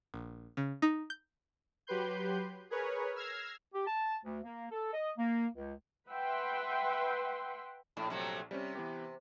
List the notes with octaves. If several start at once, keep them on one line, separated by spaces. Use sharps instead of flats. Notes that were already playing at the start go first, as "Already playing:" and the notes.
A#1
C#3
D#4
G6
F#3 G4 B4 C6 G6
G#4 A#4 B4 C#5
E6 F6 G#6 A#6 C7
G4
A5
D2
A#3
A4
D#5
A#3
C#2
B4 E5 F#5 G5 C6
A#1 A2
C3 F#3 A3
C3 G3 C4 C#4
E3 B3 G4